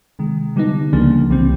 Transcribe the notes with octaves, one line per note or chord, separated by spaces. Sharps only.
C3 D#3 G#3
D3 G3 B3 D#4
C#2 C#3 F3 A#3 D4
C2 C3 E3 G3 C4